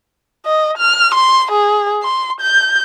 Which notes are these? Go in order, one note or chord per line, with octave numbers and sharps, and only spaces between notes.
D#5
F6
C6
G#4
C6
G6